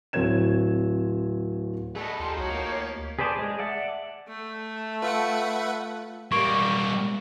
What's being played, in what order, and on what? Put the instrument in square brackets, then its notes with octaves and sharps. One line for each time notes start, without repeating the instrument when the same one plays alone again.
[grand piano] D1 C4 C#5 G#6 E7
[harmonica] A3 B3 D4 [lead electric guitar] G#4 A4 [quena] D#5
[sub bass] D#2 [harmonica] F3 D#4 G4 [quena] C6
[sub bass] C2 [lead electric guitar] F#4 [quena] C#5
[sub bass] D2 [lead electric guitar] A#3
[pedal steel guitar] G#4 B4 C5 D5 A5
G#3 G#4
D5 E5 F#5 A5
[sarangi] A3
[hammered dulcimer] F4 [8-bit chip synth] B4 E5 F#5
[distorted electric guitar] G3 A#3 [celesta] C#6